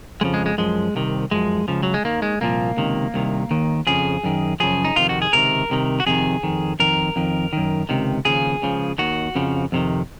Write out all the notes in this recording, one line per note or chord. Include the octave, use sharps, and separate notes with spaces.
F2 C#3 F3 G#3
G#3
G#3
F#2 F3 G#3
C2 C3 D#3
F#2 F3 G#3
C#2 C#3 F3
F#3
G#3
D#2 D#3 A#3
G#3
C2 A#2 F3 A#3
C#2 C3 D#3
C2 C3 D#3
D#2 D#3
F2 C#3 F3 G#4
F#2 D#3
F#2 C#3 F3 G#4
D#4
F2 C3 D#3 F4
F#4
G#4
C#2 C3 D#3 A#4
C2 C3 D#3
F#4
F2 C3 D#3 G#4
F2 D#3
F2 D#3 A#4
F2 D#3
F#2 D#3
C#2 C3 D#3
D#2 C#3 F3 G#4
C#2 C#3 F3
D#2 D#3 F#4
F2 C#3 F3
F2 C3 D#3